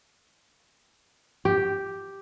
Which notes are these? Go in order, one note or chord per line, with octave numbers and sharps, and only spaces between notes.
G4